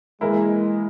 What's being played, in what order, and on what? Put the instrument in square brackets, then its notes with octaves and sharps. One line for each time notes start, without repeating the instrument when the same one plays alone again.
[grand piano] E3 A#3 E4 A#4 [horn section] G#3